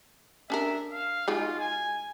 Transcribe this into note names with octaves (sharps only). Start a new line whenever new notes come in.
C#4 D4 A#4 E5
F5
G#3 D#4 F4 F#4
G#5